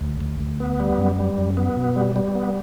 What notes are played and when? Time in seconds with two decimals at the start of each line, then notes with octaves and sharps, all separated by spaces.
0.01 D2
0.21 D2
0.40 D2
0.60 B3
0.80 G3
0.98 F#2
1.19 G3
1.38 F#2
1.57 B3
1.76 B2
1.96 G3
2.16 G3
2.35 B3